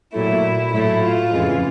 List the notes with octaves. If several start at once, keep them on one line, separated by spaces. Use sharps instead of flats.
A#2 F#3 A3 E4
A2 F#3 A3 E4
F4
F2 C#3 E3 G#3